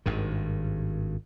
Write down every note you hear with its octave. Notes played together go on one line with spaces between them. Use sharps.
G#1 G2 D#3